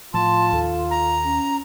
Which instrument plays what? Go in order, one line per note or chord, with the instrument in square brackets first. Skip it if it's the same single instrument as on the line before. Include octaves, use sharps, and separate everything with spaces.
[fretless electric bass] A2 F3 [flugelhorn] F4 [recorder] A5 [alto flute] C6
[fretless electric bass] D#2 [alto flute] A4
[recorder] A#5
[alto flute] C#4